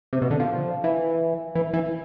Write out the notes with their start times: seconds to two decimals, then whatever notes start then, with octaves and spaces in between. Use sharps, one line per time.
0.13 C3
0.22 B2
0.31 D3
0.40 F3
0.84 E3
1.55 E3
1.73 E3